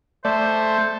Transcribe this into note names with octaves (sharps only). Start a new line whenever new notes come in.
A3 C5 D5 E5